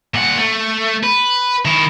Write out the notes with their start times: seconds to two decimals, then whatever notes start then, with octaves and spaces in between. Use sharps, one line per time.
0.14 A#2 F#5
0.37 A3
1.03 B4
1.65 D#3 E4